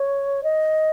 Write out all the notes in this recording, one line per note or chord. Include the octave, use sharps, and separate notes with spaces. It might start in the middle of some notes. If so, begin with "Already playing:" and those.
Already playing: C#5
D#5